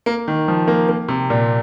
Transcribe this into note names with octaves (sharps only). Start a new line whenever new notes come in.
A#3
D#3
F3
A#3
A#3
C3
A#2